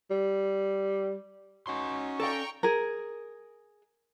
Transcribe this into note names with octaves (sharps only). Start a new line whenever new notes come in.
G3
C#4 D#4 F#4 C#5 C6
A4 D5 F5 G5 A#5 C#6
G#4 A#4